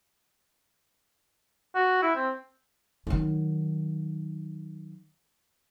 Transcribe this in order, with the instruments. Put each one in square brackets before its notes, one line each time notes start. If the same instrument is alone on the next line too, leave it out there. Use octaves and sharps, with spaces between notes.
[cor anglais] F#4
E4
C4
[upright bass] D#3 F#3